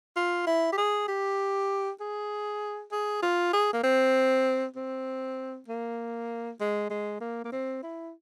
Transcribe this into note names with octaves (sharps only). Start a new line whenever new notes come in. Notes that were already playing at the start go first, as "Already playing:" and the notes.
F4
E4
G4
G#4
G4
G#4
G#4
F4
G#4
A#3
C4
C4
A#3
G#3
G#3
A#3
A#3
C4
E4